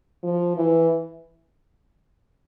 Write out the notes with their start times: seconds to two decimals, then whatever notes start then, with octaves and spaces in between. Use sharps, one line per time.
0.23 F3
0.57 E3